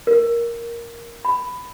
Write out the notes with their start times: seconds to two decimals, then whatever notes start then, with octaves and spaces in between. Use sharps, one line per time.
0.07 A#4
1.25 B5